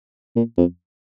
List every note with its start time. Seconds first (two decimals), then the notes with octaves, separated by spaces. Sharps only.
0.36 A#2
0.58 F2